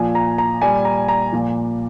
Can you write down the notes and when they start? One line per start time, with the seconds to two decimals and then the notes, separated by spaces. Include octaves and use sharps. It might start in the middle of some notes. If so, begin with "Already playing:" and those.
Already playing: A#2 F3 G#5
0.15 A#5
0.38 A#5
0.62 A#2 G3 G#5
0.85 A#5
1.09 A#5
1.32 A#2 F3